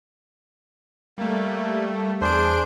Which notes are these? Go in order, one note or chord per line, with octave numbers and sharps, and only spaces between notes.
G3 A3 A#3
E2 D4 G#4 C5 D7